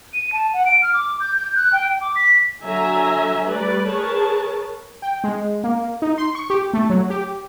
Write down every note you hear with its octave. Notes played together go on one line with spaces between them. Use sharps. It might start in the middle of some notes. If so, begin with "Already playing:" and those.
D#7
A5
F#5
D7
F6
D6
G6
G6
F#6
G5
D6
B6
D3 F#3 E5 G#5 A#5
G3 A3 B4 D5
G#4 A#4 B4 C#5 A5
G5
G#3
A#3
D#4
C6
C#6
G4
A3
F#3
G4